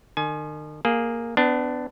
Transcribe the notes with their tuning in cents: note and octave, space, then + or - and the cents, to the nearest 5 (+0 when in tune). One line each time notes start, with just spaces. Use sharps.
D#3 -40 G#5 +25
A#3 +0 G#4 +0
B3 +30 D4 +0